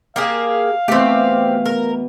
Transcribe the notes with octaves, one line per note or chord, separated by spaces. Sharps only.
A#3 G4 G#4 F5
B2 E3 A3 C4 G4
A#4